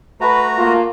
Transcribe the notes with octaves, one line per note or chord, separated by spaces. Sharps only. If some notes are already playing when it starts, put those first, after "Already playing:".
A3 F#4 B4 A#5
A#3 F4